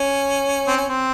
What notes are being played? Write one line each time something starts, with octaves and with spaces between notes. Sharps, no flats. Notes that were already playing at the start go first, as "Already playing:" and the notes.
Already playing: C#4
C4
C#4
C4